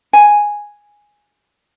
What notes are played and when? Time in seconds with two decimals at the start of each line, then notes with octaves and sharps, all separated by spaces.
0.13 G#5